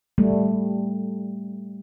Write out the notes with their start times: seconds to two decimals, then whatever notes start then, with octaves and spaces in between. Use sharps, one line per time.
0.18 G3 A3